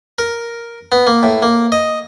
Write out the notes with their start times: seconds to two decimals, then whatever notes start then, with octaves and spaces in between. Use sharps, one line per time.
0.19 A#4
0.92 B3
1.07 A#3
1.23 A2
1.42 A#3
1.72 D#5